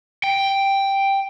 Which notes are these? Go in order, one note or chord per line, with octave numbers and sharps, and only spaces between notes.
G5